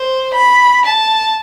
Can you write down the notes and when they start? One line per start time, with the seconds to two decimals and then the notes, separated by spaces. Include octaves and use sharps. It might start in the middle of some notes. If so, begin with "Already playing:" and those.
Already playing: C5
0.34 B5
0.85 A5